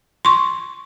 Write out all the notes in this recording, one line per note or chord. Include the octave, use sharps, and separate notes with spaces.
C6 C#6